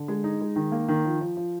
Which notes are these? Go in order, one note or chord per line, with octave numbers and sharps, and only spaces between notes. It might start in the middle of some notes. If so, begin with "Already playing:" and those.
Already playing: D3
G#3
D#4
G#3
D#3
A#3
D#3
F3
F3
F3